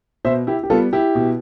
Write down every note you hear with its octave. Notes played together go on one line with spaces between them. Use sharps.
B2 C5 E5
E4 G4
G4
G3 B3 F4 A4
E4 G4
B2